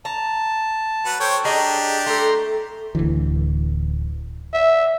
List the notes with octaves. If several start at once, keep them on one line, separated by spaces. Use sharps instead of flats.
A5 A#5
F#3 B4 F#5
A4 C5 C#5 G5
D4 G4 G#4 D#5 A#5
A3 A4 A#5 C6
D1 D2 E3
E5